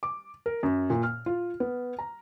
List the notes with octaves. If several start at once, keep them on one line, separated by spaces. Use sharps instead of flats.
D6
A#4
F#2
A#2
F6
F4
B3
A#5